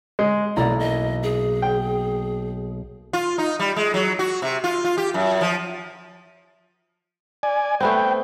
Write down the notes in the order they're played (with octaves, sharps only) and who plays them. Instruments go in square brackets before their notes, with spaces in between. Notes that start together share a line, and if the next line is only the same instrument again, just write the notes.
[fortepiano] G#3
[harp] B1 A#3 [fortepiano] E4 A#5 [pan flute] D5
[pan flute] D#5
G#4
[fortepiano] G5
[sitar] F4
D#4
G3
G#3
F#3
F#4
C3
F4
F4
G4
F#2
F3
[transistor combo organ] D5 G#5
[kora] A3 B3 C4 [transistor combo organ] G5